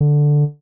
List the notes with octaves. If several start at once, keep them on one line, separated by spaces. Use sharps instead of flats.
D3